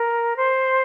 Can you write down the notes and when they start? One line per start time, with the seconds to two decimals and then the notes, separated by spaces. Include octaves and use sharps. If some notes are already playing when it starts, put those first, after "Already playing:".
Already playing: A#4
0.37 C5